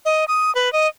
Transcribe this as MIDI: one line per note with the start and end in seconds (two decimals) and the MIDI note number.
0.05 0.25 75
0.28 0.53 87
0.55 0.72 71
0.73 0.87 75